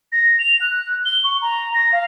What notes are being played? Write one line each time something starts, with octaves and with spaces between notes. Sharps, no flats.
A#6
F7
F#6
G7
C#6
A#5
A#6
F5